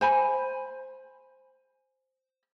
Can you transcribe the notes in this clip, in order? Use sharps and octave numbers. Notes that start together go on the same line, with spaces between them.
C5 G#5 B5